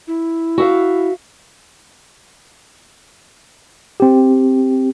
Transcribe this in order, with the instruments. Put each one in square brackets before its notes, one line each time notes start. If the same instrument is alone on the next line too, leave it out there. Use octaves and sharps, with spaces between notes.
[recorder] E4
[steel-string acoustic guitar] F#4 E5 F5
[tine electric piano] C4 G4